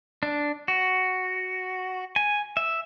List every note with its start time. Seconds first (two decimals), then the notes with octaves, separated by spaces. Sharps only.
0.23 D4
0.68 F#4
2.16 G#5
2.57 E5